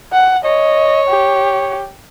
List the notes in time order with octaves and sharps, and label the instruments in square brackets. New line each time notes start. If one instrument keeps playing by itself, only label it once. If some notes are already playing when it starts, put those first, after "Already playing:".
[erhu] F#5
[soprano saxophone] C#5 [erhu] D#5
[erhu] G4